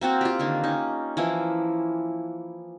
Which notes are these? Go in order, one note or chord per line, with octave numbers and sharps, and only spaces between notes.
A#3 C4 F#4 C5
F4 G4
D3 D#3 A#3
C#4 D#4
E3 F3 A#3 E4